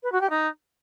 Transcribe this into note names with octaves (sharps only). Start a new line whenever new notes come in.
B4
F#4
G4
D#4